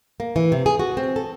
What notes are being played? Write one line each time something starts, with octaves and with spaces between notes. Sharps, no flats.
A#3
E3
C3
G#4
F#4
C4
A4